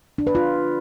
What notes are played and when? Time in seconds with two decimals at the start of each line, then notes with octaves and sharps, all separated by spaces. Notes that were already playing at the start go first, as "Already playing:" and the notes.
0.18 D4
0.27 B4
0.35 F4